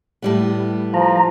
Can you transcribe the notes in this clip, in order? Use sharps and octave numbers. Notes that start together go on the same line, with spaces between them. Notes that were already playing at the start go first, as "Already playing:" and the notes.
A2 G3 B3
F3 A#5